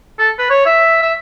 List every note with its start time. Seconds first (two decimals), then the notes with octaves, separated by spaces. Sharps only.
0.19 A4
0.39 B4
0.50 C#5
0.66 E5
1.02 E5